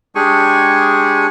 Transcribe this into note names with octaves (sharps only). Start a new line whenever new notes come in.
G#3 D4 G4 G#4 G#5 C#6